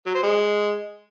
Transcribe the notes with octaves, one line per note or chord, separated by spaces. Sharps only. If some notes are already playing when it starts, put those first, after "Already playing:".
F#3
C5
G#3